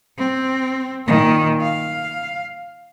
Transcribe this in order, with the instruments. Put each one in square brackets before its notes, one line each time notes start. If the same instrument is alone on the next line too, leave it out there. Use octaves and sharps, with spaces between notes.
[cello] C4
A#2 D#3
F5